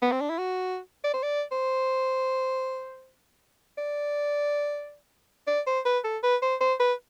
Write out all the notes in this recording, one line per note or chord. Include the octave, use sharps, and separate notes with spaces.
B3
C4
D4
E4
F#4
D5
C5
D5
C5
D5
D5
C5
B4
A4
B4
C5
C5
B4